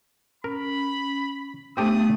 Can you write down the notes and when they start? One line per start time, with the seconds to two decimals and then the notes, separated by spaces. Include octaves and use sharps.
0.44 C#4 A#4 B5
1.77 A3 B3 C4 D4 G4 A4 D#6